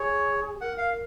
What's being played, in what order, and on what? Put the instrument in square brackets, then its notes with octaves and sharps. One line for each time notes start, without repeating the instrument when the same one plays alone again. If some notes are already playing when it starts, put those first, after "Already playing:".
Already playing: [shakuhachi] G#4 [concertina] C#5
[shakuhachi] A#4 [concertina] F#5
[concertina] F5